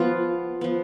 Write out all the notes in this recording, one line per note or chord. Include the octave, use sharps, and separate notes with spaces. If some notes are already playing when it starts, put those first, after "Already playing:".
Already playing: F3 B3 F4
F3 B3